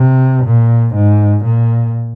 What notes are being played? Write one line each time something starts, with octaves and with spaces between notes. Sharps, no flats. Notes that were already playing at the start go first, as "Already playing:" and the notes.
Already playing: C3
A#2
G#2
A#2